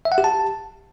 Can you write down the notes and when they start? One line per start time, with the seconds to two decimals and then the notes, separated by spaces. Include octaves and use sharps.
0.05 E5
0.12 F#5
0.18 G4
0.24 A5